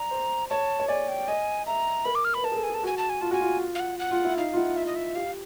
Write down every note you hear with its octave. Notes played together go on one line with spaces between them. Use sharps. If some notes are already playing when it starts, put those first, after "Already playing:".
Already playing: D5 A#5
C5
C#5 A5
C#5
D5 G#5
G5
D#5 G#5
E5 A#5
A#4 B5
D6
F6
B4 B5
A#4 A5
G#4
A4
G#5
G#4
A5
F#4 G#5
A5
G#5
F4 A5
F#4 G#5
F4
F5
F#5
F#5
F4
E4
D#4 F5
F4
E4 F#5
E5
D#5
E5
G4 F5